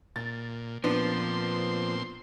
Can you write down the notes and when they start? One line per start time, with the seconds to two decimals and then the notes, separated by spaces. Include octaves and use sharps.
0.16 A#2 A6
0.84 A#2 F3 B3 C4 D4 C6